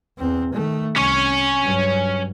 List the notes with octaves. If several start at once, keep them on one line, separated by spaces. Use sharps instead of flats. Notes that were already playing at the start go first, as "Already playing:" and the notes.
E2 C4
D#3 A3
C2 C#4 C#5
G2 F#3